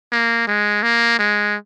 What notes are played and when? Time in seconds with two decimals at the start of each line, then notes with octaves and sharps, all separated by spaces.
0.12 A#3
0.48 G#3
0.83 A#3
1.19 G#3